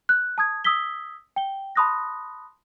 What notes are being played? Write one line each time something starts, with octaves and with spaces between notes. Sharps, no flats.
F#6
A5 D#6 G#6
D#6 E6 G#6 B6 G7
G5 G7
A5 B5 C6 D#6 F#6 A#6